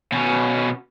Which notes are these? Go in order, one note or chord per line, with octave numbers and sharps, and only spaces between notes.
B2 C#4